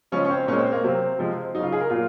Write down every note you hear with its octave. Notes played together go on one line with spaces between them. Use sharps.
C#3 F3 G#3 C#4
C#4
C4
A#2 G#3 C#4
C4
A#3
C3 F#3 C4
C3 F3 G#3
C#3 F#3 D#4 F4
G#4
A#4
A#2 F#3 F4